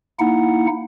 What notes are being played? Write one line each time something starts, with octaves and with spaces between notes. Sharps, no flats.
A#3 D#4 E4 F#5